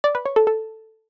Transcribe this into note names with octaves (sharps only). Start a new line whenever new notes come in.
D5
B4
C#5
A4
A4